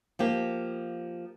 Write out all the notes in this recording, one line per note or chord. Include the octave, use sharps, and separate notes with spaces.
F3 A#3 G4